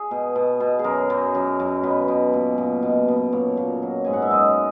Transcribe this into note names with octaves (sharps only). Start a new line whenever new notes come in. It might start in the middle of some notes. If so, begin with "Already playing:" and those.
Already playing: G#4
B2
B2
B2
G#4
F#2 A#4
F#2
F#2
F#2
B2 B4
B2
A#2
A#2
B2
B2
A#2 C#5
A#2
F#3
G#2 G#5
F#5
E5
F#2 D#5